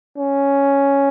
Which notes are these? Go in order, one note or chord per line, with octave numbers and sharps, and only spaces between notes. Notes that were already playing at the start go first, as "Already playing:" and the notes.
C#4